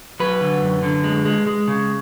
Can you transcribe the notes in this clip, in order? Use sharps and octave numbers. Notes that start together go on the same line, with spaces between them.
F#3 B4
D3
F#2
D3
G#3
G#3
G#3
C#3